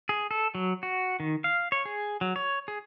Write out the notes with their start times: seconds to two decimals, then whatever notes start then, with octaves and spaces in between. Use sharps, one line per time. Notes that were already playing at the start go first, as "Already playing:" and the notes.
0.09 G#4
0.31 A4
0.55 F#3
0.83 F#4
1.20 D#3
1.44 F5
1.72 C#5
1.85 G#4
2.21 F#3
2.36 C#5
2.68 G#4